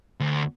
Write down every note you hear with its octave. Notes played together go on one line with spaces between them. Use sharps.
D2